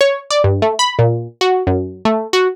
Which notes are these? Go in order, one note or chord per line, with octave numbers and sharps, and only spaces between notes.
C#5
D5
G2
A3
B5
A#2
F#4
F#2
A3
F#4